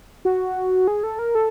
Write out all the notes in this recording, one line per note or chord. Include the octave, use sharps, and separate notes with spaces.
F#4
G#4
A4
A#4
A4